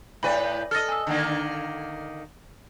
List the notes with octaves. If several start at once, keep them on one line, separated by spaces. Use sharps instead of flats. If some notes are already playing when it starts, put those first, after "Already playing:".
A2 B4 D5 G#5 B5
A4 D#5 F6 A6 A#6
G#5 E6
D3 D#3 A#3